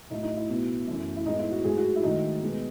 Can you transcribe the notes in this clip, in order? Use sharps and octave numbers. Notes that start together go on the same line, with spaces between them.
A2 F#3 A3 D#4
D#4
E4
B2 F#3 B3
F#2 E3 A3
E4
A2 G#3 B3 D#4
E4
F#4
G#2 F#3 A3 G#4
F#4
E4
G#2 D#3 F#3 A3 D#4
B2 G#3 B3